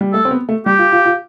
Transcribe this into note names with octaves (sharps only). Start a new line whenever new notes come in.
G3
A3 A4
C4
B3
A3
G3 G4
F4
F4
F4